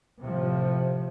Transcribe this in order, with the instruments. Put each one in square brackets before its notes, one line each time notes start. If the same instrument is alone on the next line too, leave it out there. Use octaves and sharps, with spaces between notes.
[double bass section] A2 C3 F3